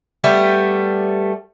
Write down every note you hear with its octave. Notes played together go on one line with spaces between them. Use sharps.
G3 A3 B3 G4